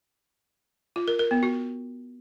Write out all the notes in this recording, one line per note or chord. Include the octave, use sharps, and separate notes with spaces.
F4
A#4
A#4
B3
F#4